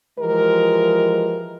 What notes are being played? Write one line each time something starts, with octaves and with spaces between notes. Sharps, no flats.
E3 F3 G#3 G4 A#4